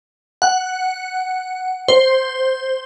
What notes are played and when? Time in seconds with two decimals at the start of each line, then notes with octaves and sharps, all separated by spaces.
0.42 F#5
1.88 C5